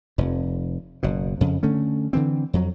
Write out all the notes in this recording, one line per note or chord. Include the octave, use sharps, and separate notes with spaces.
F1 F2
F#1 B2
F2 C#3
D3 A3 C#4
D3 E3 C4
F2 F#3